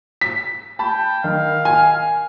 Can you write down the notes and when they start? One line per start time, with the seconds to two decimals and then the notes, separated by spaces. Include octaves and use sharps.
0.21 B6
0.79 G5 A5 B5
1.24 D#3 F5
1.65 G#5